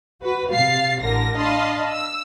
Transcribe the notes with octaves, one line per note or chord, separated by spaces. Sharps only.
F#4 B4
C3 F5 A6 C7
A1 D3 A#4 A#6
D4 D#5 F5 A5 B5 C6
E6